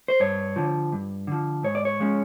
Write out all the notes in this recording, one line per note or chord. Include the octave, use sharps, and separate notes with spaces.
C5
G2 C#5
D3 F3
G2
D3 F3
G#2 C#5
D5
C#5
F3 G#3 C#4